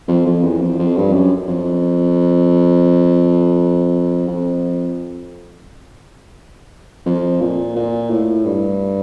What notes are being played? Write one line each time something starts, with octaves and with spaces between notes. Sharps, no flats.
F2
F2
E2
F2
F2
G2
F#2
F2
F2
F2
A#2
A#2
A2
G2